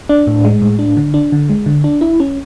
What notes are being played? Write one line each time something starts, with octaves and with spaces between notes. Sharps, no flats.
D4
A2
G#3
A2
D4
D3
D4
D3
G#3
D3
D4
E4
C#4